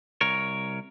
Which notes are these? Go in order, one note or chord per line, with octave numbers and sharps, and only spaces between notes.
C2 A#4 C#5